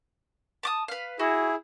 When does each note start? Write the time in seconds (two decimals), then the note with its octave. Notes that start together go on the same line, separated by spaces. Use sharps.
0.63 A5 D6 D#6
0.88 B4 F5
1.19 E4 F#4 G#4